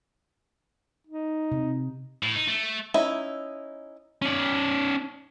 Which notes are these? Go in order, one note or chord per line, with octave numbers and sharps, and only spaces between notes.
D#4
C3
A2
D#4
A3
C#4 D#4 E4 E5
C#4 D5